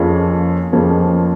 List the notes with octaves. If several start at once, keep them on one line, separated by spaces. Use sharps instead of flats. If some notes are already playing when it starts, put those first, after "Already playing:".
Already playing: F2 F3 A#3 C#4 G#4
F2 F3 A#3 C#4 G#4